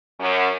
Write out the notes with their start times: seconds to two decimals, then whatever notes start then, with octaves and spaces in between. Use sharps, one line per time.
0.20 F#2